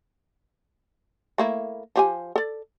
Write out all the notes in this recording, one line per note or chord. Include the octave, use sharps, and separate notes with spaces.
A3 A#3 E4
F3 G4 G#5
A4 D5